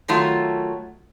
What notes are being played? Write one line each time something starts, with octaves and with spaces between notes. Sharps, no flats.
D#3 F#3 A3 F4